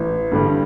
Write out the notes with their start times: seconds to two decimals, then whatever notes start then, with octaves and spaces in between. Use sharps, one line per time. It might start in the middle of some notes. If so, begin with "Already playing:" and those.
Already playing: A1
0.32 G2 D3 G3